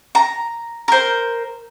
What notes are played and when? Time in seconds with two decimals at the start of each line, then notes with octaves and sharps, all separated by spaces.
0.15 A#5
0.88 A#4 C5